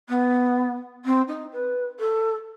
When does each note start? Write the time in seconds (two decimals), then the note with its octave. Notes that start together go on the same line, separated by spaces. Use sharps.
0.08 B3
1.05 C4
1.27 D#4
1.52 B4
1.99 A4